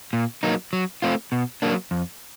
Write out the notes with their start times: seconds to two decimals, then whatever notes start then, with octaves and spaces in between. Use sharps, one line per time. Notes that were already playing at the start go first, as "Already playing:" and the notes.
0.13 A#2
0.43 F#3 A#3 D#4
0.73 F#3
1.02 A3 C4 F4
1.32 B2
1.62 F#3 A#3 D4
1.91 F2